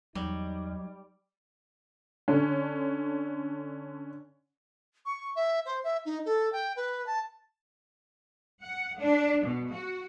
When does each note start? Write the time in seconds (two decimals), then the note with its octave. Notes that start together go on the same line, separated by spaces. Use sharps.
0.15 E2 F#3 G3 D#4
2.28 D3 C#4
5.05 C#6
5.35 E5
5.66 C5
5.84 E5
6.05 D#4
6.26 A4
6.52 G5
6.76 B4
7.06 A5
8.63 F#5
8.99 D4
9.44 B2
9.72 F#4